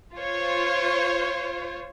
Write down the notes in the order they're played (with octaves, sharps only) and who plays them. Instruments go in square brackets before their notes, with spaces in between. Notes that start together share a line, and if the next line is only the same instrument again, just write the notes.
[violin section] F4 C5 C#5